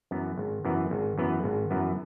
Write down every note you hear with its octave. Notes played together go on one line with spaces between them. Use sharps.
F#2 E3 B3
G#1
F#2 E3 B3
G#1
F#2 E3 B3
G#1
F#2 E3 B3